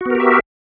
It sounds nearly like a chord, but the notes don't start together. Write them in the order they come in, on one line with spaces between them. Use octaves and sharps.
F#4 B3 A#4 G4 E5